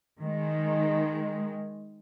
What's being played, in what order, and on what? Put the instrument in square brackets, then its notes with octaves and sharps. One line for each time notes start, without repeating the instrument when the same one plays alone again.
[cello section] D#3 G#3